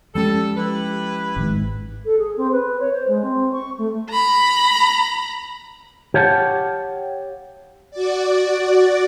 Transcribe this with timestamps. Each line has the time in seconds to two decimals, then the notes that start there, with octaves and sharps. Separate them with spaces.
0.15 F3 G3 G#3 C#4 A4
0.57 E4 G4 B4
1.37 G#1 G#2
2.05 A4
2.19 G#4
2.37 C4
2.52 B4
2.80 C#5
2.93 C5
3.08 G#3
3.22 C4
3.52 C#6
3.78 A3
4.11 A#5 B5
6.14 G4 C#5 F5 F#5 A5
7.91 F#4 D5